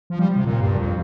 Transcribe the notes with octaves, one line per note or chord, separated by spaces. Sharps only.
F3
G3
C3
A#2
G2
F2